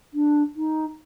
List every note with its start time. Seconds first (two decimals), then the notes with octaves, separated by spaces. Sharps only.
0.14 D4
0.56 D#4